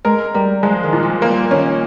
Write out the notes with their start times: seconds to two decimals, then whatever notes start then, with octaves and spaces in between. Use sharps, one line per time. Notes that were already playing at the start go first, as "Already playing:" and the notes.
0.04 G#3 A#4
0.34 G3 A#4
0.63 F3 G#3
0.83 D#3
0.93 A#2
1.03 F3
1.21 F3 A#3
1.30 G3
1.39 F3
1.51 D#3 C#4